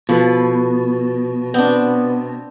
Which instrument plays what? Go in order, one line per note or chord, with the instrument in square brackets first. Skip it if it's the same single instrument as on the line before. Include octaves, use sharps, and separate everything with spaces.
[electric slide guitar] B2 [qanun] F3 A4 B4
[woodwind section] B3 [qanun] C4 D4